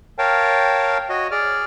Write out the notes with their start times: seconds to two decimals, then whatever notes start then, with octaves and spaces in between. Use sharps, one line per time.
0.18 A#4 C#5 F5 G5 A5
1.09 F#4 C#5 D#5
1.31 G#4 D5 F6